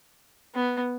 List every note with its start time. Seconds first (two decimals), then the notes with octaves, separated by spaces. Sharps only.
0.55 B3